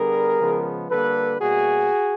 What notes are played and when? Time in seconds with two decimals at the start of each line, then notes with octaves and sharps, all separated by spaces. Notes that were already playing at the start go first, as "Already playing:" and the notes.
Already playing: D3 G3 B3 G#4 A#4
0.39 C#3 F3 G#3 B3
0.89 D3 G3 A#3 A4 B4
1.39 B2 G3 A#3 F#4 G#4